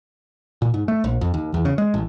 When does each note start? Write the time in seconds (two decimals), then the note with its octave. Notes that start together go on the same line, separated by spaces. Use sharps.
0.62 A#2
0.74 G#2
0.88 A3
1.04 A#1
1.21 F2
1.34 D#2
1.54 E2
1.65 C#3
1.78 G#3
1.94 A1